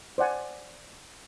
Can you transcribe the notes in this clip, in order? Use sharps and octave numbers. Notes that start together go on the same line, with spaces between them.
C5 D5 F#5 G#5